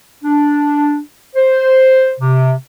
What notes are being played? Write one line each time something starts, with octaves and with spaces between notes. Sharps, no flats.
D4
C5
C3